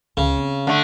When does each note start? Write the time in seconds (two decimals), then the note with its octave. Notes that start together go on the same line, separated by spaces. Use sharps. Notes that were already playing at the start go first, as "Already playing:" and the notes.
0.17 C#2 C#3
0.37 C4
0.67 D3 A3